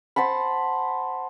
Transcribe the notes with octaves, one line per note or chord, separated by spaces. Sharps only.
C5 F#5 A5 B5